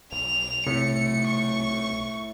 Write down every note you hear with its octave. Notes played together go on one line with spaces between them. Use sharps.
B1 F7
A2 C3 C#7
C#6